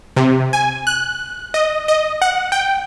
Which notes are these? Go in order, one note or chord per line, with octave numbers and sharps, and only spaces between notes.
C3
G#5
F#6
D#5
D#5
F#5
G5